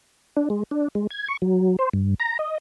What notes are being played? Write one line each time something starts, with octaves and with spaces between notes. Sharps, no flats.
D4
G#3
D4
G#3
G#6
C#6
F#3
C5
G2
A#5
D#5